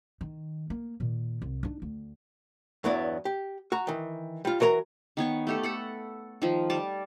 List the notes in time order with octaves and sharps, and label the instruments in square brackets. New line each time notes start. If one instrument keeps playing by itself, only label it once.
[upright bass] D#3
A#3
A#2 D#3
C2
D4 D#4
D2
[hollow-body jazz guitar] E2 G2 F#3 B3 E4 D5
G4
F#4 A#5
D#3 E3
G3 F4
E3 F#3 A#4 C#5 A#5
[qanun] D#3 B3 C#5 C#6
A3 G4 A4
A4 F#5 B5
D#3 F3
G3 A5 D6